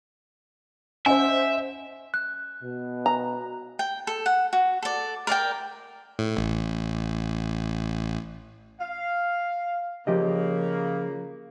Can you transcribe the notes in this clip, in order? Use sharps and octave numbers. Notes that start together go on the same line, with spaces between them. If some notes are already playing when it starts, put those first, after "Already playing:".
C#4 C5 D#5 E5 F#5 G#5
F#6
B2
A#5
G5
A4
F#5
F#4
A4 D5
A#4 D5 F5 G5
A2
A1
F5
C#3 F3 A#3 G4 D#5